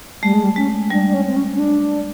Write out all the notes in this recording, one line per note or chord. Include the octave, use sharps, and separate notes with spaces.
G3 A3
G#3
G3
G#3 C#4
G3 D4
D4
C#4
C4
C#4
C#4
D4